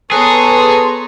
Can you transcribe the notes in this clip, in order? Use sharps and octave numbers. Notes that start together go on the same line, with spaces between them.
B3 G#4 A4 B4 C#5 A#5 C6